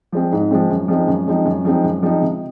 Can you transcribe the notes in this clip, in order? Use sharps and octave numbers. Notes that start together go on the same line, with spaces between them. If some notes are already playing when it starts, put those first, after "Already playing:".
F3 G#3 C4
G#2
F3 G#3 C4
F#2
F3 G#3 C4 D#4
F#2
F3 G#3 C4 D#4
F#2
F3 G#3 C4 D#4
F#2
F3 G#3 C4 D#4
C3